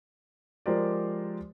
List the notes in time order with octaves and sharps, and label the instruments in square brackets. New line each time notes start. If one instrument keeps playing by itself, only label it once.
[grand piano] F3 G#3 G4 A#4 C5 D5